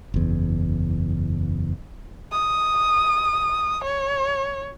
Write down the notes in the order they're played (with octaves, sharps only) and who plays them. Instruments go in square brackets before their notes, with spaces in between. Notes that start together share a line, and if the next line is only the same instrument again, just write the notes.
[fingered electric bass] F#1 E2
[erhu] D#6
C#5